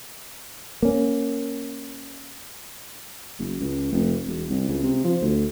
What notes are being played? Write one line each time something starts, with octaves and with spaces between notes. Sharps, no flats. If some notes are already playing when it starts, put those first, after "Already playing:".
A#3 C#4
F#1
C#2
F1
E1
C2
C#2
C3
F3
D2